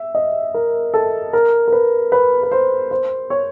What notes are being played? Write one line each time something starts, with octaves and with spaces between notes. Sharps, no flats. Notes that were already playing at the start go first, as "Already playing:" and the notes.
Already playing: E5
D#5
A#4
A4
A#4
A#4
B4
B4
B4
C5
C5
C#5